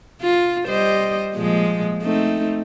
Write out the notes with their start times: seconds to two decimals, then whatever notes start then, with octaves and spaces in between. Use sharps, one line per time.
0.22 F4
0.66 G3 C5 D#5
1.34 A#2 F3 G#3
2.02 A3 C4 D#4